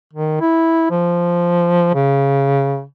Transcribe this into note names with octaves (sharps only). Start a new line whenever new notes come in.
D#3
E4
F3
C#3